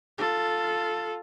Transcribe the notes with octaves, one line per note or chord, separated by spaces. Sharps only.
F4 A4